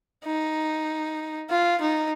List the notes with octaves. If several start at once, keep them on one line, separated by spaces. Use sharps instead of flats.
D#4
F4
D#4